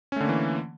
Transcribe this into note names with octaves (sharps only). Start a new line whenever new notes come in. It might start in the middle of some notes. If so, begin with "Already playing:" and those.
D3 E3 A3 A#3 C#4